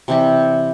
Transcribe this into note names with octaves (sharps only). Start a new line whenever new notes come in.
C3 E3 G3